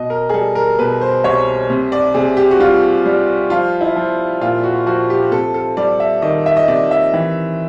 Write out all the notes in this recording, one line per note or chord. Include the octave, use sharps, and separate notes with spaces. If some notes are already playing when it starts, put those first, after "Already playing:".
Already playing: B2 D#5
A#4
G#4
G3 A4
A#4
B2 B4
C5
C2 C#5
C3
D5
C3 G#4
G4
F#4
G3 F4
G3
F3 F4
E4
F3
A#2 F4
F#4
F3 F#4
G4
C3 A4
A4
G3 D5
E5
D#3 D#5
E5
D#5
C3 D5
E5
E3